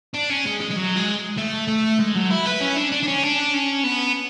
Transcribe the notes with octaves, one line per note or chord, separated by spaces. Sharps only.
D4
C#4
G#3
G#3
G#3
F#3
G#3
A3
A3
G#3
F#3
E4
B4
C#4
D4
D4
D4
C#4
D4
C#4
B3